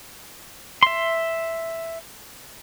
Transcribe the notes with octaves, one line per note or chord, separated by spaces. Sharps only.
E5 C6